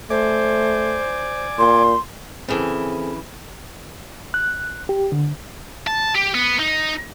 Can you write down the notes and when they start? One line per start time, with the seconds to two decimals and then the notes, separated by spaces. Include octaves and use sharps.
0.10 A3 C5 D5 G#5 D6
1.59 A#2 C6
2.49 C#3 E3 C4 G#4 A4
4.34 F#6
4.89 G4
5.12 D3
5.87 A5
6.15 G4
6.34 B3
6.59 D#4